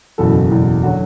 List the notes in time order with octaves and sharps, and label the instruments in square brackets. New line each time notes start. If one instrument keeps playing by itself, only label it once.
[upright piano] F#1 E2 B2 A4
F#1 E2 B2
D3 F#3 F#4